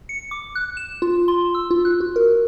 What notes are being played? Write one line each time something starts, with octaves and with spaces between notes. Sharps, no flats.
C#7
D6
F#6
E7
F4
C6
E6
F4
F#6
F#4
A#4